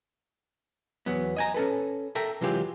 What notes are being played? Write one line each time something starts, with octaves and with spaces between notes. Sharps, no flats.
E2 F#3 B3
D#5 G#5 A#5
C#4 A4 B4
A4 A#4 E5 G5 A#5
C3 E3 F#3 G#3 F4 G4